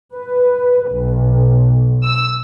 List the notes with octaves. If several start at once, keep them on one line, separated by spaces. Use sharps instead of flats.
B4
B1
E6